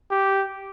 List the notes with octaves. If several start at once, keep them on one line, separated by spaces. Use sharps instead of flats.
G4